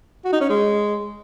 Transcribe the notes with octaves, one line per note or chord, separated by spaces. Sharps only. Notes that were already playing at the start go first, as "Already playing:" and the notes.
F#4
D#4
C#4
G#3